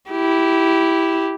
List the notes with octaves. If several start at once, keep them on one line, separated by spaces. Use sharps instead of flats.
E4 G4